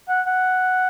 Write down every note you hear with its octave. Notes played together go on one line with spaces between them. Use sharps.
F#5
F#5